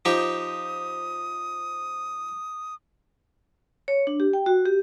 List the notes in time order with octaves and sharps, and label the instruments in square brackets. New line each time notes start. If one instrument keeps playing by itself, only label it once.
[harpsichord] F3 D#4 G4 [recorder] D#6
[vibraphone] C#5
D4
G4
G5
F#4
G4